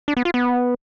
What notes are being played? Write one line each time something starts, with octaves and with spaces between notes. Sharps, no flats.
D4
B3
F4
B3